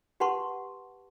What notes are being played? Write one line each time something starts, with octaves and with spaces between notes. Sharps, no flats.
G4 B4 F#5 A5 C6 C#6